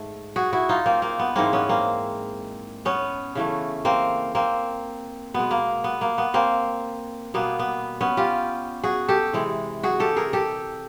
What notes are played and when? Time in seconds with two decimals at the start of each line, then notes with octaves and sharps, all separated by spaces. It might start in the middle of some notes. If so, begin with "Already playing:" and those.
Already playing: G#2 A3
0.36 F#4 G#4
0.53 E4 F#4
0.69 D#4 F4
0.86 A#3 C4
1.02 A#3
1.19 B3
1.36 G#2 E3 G#3 A#3 C4
1.53 B3 C#4
1.69 A#3 C4
2.85 B3 C#4
3.35 C#3 E3 A3
3.85 A#3 C4
4.35 A#3 C4
5.34 B2 G#3 B3
5.51 A#3
5.84 B3
6.01 A#3
6.18 B3
6.34 A#3 C4
7.34 B2 G3 A#3 B3
7.59 B3
8.01 B3 C#4
8.17 F4 G4
8.84 F#4 G#4
9.08 G4 A4
9.33 C3 E3 G#3
9.83 F#4 G#4
10.00 G4 A4
10.16 G#4 A#4
10.33 G4 A4